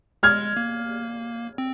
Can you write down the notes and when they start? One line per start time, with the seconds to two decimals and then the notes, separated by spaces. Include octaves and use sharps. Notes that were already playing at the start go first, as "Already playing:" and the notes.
0.23 G#3 F6 G#6
0.57 A#3
1.58 C4